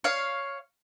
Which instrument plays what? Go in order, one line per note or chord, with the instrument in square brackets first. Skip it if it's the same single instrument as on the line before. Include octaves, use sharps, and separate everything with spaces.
[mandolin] C#5 F5